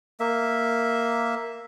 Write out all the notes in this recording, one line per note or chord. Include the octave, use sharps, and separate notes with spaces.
A#3 E5